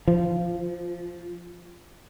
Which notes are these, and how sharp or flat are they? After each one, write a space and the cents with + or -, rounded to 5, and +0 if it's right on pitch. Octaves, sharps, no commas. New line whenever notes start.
F3 -10